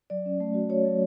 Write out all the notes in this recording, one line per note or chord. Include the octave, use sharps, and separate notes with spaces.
F#3 D5
C#4
A3
F#4
F#4 C#5
F#3